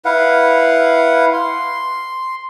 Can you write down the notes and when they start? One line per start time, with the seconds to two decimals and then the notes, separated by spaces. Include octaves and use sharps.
0.05 E4 B4 F5 F#5
1.33 C6